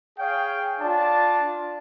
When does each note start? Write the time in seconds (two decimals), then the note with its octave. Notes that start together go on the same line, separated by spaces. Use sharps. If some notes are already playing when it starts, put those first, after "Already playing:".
0.19 G#4 C#5 F5 G5
0.80 D4 F4 D5 A5